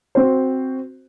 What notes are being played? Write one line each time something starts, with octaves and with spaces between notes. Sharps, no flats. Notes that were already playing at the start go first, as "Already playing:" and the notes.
C4 F#4 C5